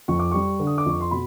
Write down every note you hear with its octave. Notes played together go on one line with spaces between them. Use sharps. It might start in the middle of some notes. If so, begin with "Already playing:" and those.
F2 C#6
D6
G3 C#6
D3
D#6
D6
F2 C#6
C6
B2 B5